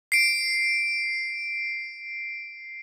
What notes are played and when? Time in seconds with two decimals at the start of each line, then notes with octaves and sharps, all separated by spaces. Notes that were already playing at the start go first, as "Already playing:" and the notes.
0.12 C7 D7